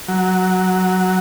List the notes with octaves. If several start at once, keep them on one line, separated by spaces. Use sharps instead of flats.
F#3